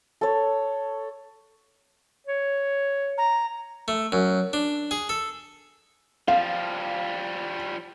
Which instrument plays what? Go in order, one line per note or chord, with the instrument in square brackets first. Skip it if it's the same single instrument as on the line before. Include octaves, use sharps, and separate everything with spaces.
[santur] A4 C#5
[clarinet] C#5
[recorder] A#5
[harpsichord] A3
F#2
D4
G#4
A4
[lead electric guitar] F3 G3 [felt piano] F5